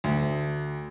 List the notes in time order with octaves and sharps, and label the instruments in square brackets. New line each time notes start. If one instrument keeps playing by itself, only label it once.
[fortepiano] D2